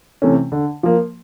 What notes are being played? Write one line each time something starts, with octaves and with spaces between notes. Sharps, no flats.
C3 E3 A3 C#4
D3
F3 A#3